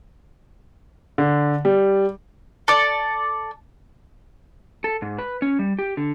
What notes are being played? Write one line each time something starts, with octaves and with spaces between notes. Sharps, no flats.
D3
G3
A4 D5
A4
G#2
B4
C#4
G3
G4
D3